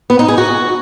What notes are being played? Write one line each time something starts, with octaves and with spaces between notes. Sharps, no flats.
B3
D#4
G#4
F#4